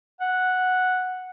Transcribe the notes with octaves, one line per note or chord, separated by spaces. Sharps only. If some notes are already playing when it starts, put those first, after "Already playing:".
F#5